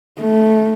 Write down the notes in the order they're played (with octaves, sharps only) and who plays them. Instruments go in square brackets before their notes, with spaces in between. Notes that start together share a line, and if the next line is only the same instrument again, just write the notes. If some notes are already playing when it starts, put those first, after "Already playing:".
[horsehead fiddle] A3